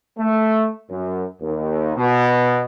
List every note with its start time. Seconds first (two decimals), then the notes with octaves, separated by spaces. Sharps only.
0.19 A3
0.89 F#2
1.41 D#2
1.97 B2